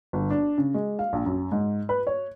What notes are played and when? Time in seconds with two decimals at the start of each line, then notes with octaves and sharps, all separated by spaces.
0.13 G1
0.30 D4
0.58 C#3
0.74 G#3
0.99 F5
1.13 A#1
1.26 F#2
1.52 G#2
1.89 B4
2.07 C#5